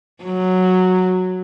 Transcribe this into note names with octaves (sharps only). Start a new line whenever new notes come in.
F#3